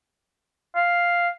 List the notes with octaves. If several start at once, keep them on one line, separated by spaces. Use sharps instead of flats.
F5